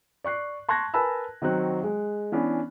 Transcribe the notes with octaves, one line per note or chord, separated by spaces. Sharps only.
D5 C#6 F#6 C7
A5 C6 C#6 F#6 G#6 A#6
A#4 B4 G#5 A5 B5 E6
D#3 F#3 C4 F#4 F#6
G#3
E3 B3 C#4 D4